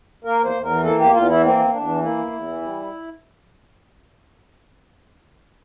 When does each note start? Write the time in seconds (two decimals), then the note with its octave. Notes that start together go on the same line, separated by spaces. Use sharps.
0.24 A#3 A#4
0.39 E2 C5
0.54 E2
0.64 A#4
0.70 E3
0.83 A#3 A4
0.98 E2 G4
1.13 E2 F4
1.29 E3 E4
1.43 A#3 C4
1.59 E2
1.73 E2 D4
1.88 E3
2.03 A#3 E4
2.18 E2
2.32 E2
2.47 E3
2.62 G3